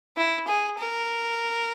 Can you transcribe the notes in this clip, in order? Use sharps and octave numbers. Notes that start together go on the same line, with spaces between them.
E4
G#4
A#4